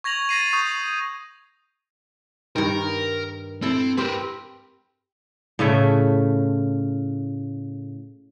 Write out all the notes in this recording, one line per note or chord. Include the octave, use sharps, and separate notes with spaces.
C#6 G#6 A#6 F7 F#7
A6 A#6 C7 D#7
C#6 D#6 G6
G2 D#3 A#4
C4 E4 A4
C4 G4 A#4 B4
A2 C#3 A3 E4